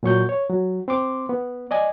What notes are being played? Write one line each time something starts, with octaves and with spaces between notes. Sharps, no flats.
A#2 F#3 C#6 G6
C#5
F#3
C4 C6 D6
B3
D5 D#5 G#5